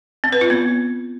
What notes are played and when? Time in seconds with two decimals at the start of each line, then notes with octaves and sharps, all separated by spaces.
0.24 C4
0.32 B4
0.41 F4
0.50 B3